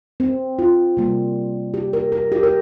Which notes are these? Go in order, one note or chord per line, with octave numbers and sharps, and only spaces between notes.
C4
F4
C3 G3 A#3
G4
A#4
A#4
G4
A#4